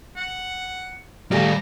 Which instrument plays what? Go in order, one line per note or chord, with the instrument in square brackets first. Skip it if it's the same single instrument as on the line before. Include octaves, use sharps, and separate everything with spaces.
[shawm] F#5
[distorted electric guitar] G3 F4 [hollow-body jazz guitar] A3 G4 G#4 [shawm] A#5